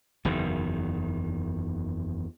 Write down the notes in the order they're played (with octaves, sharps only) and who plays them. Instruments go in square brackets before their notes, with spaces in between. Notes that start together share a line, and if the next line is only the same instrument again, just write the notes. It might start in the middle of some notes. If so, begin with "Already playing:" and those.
[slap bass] F#1 E2 D#3